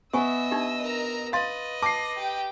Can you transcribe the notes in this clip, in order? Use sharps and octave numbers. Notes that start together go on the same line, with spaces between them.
B3 D#5 E5 G#5 C#6 D#6 E6
D4 D#4 G4
A#4 A#5
B4 D#5 F5 C6 A6
A5 D6 A#6 C7
G4 G5